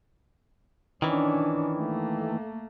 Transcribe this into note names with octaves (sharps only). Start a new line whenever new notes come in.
D#3 E3 C#4 D4
A3 A#3